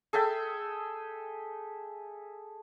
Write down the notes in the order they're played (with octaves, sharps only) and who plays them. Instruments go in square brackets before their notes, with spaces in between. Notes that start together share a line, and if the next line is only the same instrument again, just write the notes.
[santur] G#4 A4 E5 G5